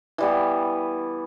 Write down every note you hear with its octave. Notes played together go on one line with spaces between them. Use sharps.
E3 G3 B3